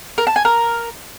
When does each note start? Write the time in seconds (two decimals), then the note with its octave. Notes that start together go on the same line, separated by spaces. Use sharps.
0.18 A#4
0.27 A5
0.36 G#5
0.45 A#4